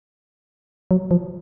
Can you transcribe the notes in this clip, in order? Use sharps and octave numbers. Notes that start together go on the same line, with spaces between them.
F#3
F3